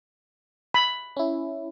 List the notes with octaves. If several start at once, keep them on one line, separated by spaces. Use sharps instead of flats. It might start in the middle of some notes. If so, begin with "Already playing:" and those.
B5
C#4 E4